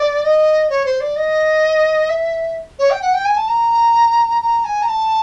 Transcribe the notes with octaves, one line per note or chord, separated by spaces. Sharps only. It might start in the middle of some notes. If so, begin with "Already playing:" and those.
Already playing: D5
D#5
C#5
C5
D5
D#5
E5
C#5
G5
F#5
G5
G#5
A5
A#5
A#5
G#5
A#5
A5